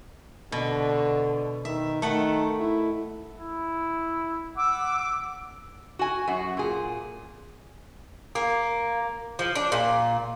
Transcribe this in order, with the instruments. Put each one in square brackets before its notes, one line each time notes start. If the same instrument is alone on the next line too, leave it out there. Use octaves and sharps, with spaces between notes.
[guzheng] B2 [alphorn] D3
[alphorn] D#3 [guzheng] E5
[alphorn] D#3 [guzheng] A3 F#5
[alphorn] E4
[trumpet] E4
[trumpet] F#5 [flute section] D6 E6
[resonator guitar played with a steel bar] F#4 G#5
F#2 F#4
A#2 G#4
[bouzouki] A#3
F3
D4
A#2